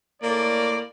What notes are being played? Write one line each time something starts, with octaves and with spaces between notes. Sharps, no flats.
A2 A#3 D5